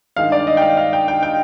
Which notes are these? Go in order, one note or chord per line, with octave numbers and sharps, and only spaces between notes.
G2 D#3 G#3 F5
D5
D#5
G5
F5
F5
G5
G5
G5